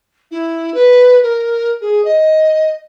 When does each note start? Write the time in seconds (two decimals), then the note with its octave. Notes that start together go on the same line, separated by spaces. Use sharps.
0.31 E4
0.74 B4
1.23 A#4
1.81 G#4
2.04 D#5